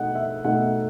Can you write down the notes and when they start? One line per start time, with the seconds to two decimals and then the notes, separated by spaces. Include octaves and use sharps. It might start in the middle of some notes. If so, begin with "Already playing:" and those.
Already playing: B2 A3 D#4 F#5
0.15 E5
0.44 B2 A3 D#4 F#5